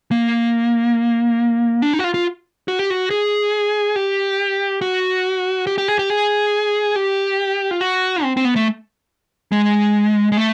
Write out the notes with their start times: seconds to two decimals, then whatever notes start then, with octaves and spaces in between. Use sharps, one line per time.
0.11 A#3
1.82 D4
1.93 D#4
1.99 F#4
2.04 F4
2.14 F4
2.68 F#4
2.79 G4
2.90 F#4
3.10 G#4
3.96 G4
4.81 F#4
5.67 G4
5.78 G4
5.88 G#4
5.99 G4
6.10 G#4
6.96 G4
7.71 F4
7.81 F#4
8.23 C4
8.37 C4
8.45 B3
8.56 A3
9.52 G#3
10.32 G#3
10.37 A3